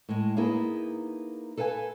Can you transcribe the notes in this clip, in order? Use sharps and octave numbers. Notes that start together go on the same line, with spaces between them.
A2 G#3
A#3 B3 D#4 E4 G#4
A4 B4 F5 F#5 G#5